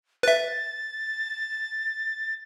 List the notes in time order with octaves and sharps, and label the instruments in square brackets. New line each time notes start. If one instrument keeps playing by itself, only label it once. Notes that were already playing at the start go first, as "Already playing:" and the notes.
[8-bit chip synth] B4 E5 [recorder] A6